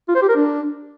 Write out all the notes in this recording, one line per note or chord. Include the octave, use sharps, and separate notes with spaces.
F4
C5
G4
A#4
D4